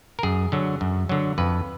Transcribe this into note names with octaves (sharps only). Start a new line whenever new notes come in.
A#4
F#2 G#4
D3 F#3
F#2
D3 F#3
F2 B4